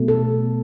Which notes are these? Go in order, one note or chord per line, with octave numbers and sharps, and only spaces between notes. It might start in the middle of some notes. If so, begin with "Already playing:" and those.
Already playing: B2 A3
A4